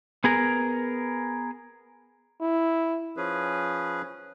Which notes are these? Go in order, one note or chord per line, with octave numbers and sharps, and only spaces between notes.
B3 G#4 A#4
E4
F3 C#4 G#4 B4